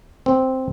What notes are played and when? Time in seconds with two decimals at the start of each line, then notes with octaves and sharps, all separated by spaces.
0.26 C4